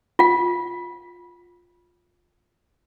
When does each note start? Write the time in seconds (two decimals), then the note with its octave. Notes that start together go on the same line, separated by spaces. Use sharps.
0.19 F4 F#5